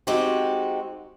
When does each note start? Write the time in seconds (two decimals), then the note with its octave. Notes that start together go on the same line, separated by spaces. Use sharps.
0.07 G#3 C4 D#4 F#4 G4